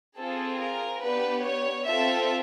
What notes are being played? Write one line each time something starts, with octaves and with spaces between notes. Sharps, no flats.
C4 F4 G#4 A4
A#4
B3 D4 G4 B4
C#5
C4 F4 A4 E5